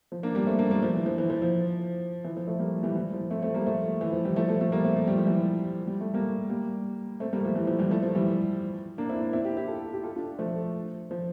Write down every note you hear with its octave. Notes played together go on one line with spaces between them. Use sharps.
F3
A#3 D4
G3 A#3
A3 C4
A#3 D4
G3 A#3
F3
E3
F3
E3
F3
F3
E3
F3
F3 A3
G3 A#3
E3 G3
E3
F3
A3 C4
A3 C4
G3 A#3
F3 A3
E3
F3
E3 G3
F3 A3
F3 A3
F3 A3
G3 A#3
A3 C4
F3
G3
F3
E3 G3
G3
A3
G3 A#3
G3 A#3
A3 C4
G3 A#3
F3 A3
E3 G3
F3
E3 G3
F3 A3
F3
E3 G3
A#3 D4
C4 E4
A#3 D4
C4 E4
E4 G4
E4 G4
F4 A4
G4
F4 A4
D4 F4
F3 A3
F3